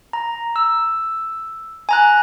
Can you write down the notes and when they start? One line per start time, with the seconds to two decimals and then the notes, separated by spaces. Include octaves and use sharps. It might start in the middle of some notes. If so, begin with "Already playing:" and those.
0.13 A#5
0.56 E6
1.89 G#5 A#5 F#6